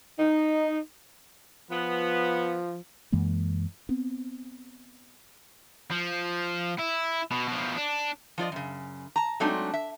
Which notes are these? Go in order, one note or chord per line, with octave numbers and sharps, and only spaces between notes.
D#4
F3 B3
F#2 E3 G#3 A#3
B3 C4
F3
E4
B2
B2 F3
D4
F3 F4 D5 D#5
F#2 C#3
A5 A#5
F#3 G#3 A3 C4 D4 D#4
E5